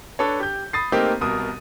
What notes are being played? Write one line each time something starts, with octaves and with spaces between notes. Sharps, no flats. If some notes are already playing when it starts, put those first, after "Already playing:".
D4 A4 B4 C#5
G4 G6
B5 D#6 A6 C7
A3 A#3 C4 D#4 G4 A#4
C2 B2 A#4 D#6